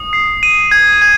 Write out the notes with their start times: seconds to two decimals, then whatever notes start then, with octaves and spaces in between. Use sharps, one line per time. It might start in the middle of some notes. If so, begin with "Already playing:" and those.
Already playing: D#6
0.13 C7
0.43 D#7
0.71 G#6
1.02 G#6